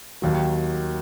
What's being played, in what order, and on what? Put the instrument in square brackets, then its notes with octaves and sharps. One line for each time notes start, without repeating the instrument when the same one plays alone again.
[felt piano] D#2 D#3 F#3